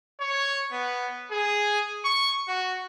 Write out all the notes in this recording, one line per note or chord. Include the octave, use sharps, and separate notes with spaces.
C#5
B3
G#4
C#6
F#4